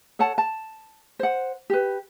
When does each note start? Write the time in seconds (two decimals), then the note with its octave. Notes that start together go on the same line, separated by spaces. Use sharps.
0.19 A4 C#5 F#5 A5
0.38 A5
1.19 C5 F#5
1.70 G4 B4